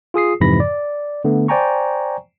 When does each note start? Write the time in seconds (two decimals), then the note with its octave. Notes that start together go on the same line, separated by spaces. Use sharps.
0.14 F4 G#4 D#6 C7
0.41 F2 G#2 C3 E3 B5 A#6
0.60 D5
1.24 D3 A3 B3
1.48 C5 D5 G5 G#5 A#5 C#6